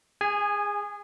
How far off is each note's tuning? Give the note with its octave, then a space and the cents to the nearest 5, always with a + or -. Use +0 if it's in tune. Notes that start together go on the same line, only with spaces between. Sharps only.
G#4 -25 G#5 +0